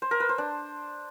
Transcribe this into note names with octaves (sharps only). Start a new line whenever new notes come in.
C5
A#4
B4
C5
D4